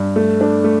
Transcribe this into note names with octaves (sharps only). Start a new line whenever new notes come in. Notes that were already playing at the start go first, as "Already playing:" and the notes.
Already playing: G2
A3
D4
A3